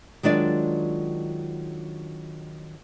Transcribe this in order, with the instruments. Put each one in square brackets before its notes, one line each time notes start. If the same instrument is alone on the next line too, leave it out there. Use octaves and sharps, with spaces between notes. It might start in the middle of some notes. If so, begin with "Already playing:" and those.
[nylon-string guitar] D#3 F#3 G#3 D4 F4 D5